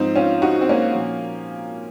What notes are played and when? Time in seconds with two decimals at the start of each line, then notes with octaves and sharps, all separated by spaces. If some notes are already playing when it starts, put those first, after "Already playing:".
Already playing: G#2 F3 C4 D#4
0.16 C#4 F4
0.42 D#4 F#4
0.61 C4
0.69 A#3 C#4
0.95 A#2 F3